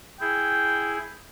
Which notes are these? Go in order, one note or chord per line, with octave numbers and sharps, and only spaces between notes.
E4 G#4 G5